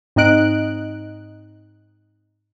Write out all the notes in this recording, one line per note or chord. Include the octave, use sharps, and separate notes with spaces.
G#2 C4 D#4 D#5 F#6 D7